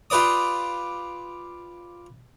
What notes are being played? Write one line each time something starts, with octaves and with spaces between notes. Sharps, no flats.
F4 G4 B4 D5 D#6